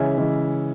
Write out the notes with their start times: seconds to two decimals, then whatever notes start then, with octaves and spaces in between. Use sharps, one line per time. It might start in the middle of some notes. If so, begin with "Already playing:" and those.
Already playing: C#3 E3 G#3 C#4 E5
0.18 C#3 E3 G#3 C#4